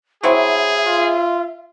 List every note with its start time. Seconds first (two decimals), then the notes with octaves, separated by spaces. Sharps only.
0.23 F#3 C4 E4 G#4 E5
0.86 F4